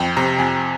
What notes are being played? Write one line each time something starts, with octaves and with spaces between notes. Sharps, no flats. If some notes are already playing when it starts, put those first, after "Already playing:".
Already playing: F2 G5
C3 A#5
F2 G#5